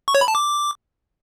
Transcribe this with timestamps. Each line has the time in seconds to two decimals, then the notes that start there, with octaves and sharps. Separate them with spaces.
0.08 C#6
0.15 C#5
0.21 B5
0.28 A5
0.35 D6